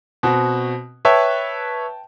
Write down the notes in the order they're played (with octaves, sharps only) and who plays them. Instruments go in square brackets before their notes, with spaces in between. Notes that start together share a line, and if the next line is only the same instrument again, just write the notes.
[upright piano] B2 C4 F#4
[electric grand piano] B4 C#5 E5 [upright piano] G5 A5